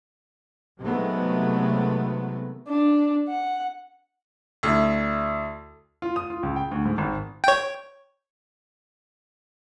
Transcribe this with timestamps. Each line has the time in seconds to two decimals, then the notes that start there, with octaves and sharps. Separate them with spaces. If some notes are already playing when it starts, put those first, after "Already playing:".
0.80 C3 D#3 F#3 G#3 A3 B3
2.68 D4
3.28 F#5
4.63 D2 E4
6.02 F4
6.16 D#6
6.30 F4
6.43 C#2
6.56 G5
6.71 D2
6.85 G#2
6.98 G#1
7.44 C#5 G5